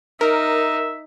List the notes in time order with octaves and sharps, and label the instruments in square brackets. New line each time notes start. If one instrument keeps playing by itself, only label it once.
[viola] D#4 [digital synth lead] A#4 [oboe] E5